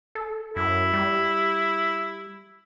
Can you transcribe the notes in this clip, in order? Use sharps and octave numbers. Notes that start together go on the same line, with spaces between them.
A4
F#2 E4
G3